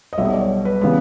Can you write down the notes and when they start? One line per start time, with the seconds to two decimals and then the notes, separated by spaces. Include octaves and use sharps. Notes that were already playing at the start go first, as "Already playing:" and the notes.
0.13 D#5
0.18 B1 B2 G3 E5
0.25 D#5
0.33 D5
0.41 C#5
0.65 B4
0.81 C#3 E3 G3 B3 B4